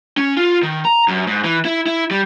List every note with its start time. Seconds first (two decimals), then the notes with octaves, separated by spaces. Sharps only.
0.17 C#4
0.37 F4
0.63 D#3
0.85 A#5
1.08 F#2
1.27 G#2
1.44 E3
1.65 E4
1.86 E4
2.11 G3